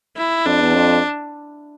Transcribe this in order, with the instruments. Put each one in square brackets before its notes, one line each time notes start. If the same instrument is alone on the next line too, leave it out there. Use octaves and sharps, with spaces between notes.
[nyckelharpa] E4
[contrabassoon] F2 [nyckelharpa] D4
[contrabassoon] E2
F2